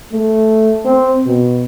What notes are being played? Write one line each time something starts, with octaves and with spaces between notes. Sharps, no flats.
A3
C4
B2